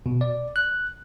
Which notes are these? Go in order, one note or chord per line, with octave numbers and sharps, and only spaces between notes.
B2
D5
F#6